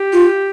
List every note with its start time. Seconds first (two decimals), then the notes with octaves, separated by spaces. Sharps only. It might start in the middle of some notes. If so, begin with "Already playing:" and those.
Already playing: G4
0.13 F4